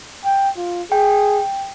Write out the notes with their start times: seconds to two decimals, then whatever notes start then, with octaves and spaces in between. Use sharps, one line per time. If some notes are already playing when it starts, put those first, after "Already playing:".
0.25 G5
0.57 F4
0.92 G#4 G5